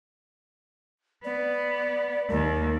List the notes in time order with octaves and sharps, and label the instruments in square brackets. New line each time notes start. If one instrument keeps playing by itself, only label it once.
[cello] B3 [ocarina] D5
[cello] D#2 [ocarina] A#4